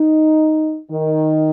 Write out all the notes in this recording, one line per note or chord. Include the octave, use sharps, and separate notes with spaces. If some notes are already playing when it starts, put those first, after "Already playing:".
Already playing: D#4
D#3